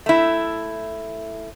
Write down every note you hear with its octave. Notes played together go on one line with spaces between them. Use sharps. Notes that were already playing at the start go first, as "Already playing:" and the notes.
A3 E4